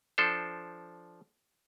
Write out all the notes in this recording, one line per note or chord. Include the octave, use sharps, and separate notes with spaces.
F3 D4 A4 C5